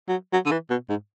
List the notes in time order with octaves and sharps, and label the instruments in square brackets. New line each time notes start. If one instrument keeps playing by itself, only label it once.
[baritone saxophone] F#3
F#3
D3
E3
B2
G#2